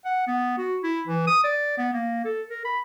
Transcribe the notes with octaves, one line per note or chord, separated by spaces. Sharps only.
F#5
B3
F#4
E4
E3
D#6
D5
B3
A#3
A4
A#4
B5